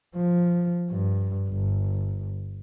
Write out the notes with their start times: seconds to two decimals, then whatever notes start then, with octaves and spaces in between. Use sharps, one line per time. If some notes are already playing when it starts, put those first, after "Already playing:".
0.16 F3
0.90 G2
1.49 G1